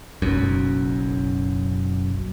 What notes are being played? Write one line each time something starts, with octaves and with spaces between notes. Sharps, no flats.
F#1 B1 F#2